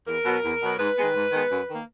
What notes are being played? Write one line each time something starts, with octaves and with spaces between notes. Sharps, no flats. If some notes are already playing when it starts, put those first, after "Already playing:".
E2 A#4
B2 F#3 B3
E2
B2 F#3 B3
G#2 B4
D#3 G#3 B3
G#2
D#3 G#3 B3
F#2
D#3 A#3